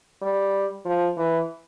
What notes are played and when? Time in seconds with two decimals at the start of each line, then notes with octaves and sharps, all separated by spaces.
0.22 G3
0.85 F3
1.17 E3